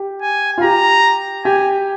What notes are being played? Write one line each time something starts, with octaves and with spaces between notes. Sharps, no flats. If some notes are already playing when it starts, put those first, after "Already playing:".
Already playing: G4
G#5
F4
G4 A#5
G4 G#5